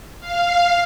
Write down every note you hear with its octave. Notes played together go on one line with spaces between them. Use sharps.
F5